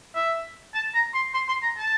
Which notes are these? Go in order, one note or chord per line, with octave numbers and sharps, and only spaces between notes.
E5
A5
A#5
C6
C6
C6
A#5
A5